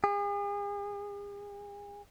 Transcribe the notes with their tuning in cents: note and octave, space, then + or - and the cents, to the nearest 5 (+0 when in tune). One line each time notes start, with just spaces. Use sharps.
G#4 -40